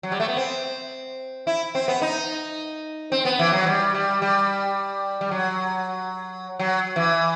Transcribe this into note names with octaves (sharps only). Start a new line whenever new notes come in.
F#3
G3
A3
B3
C4
E4
C4
B3
D#4
C4
B3
E3
F#3
G3
G3
G3
G3
F#3
F#3
E3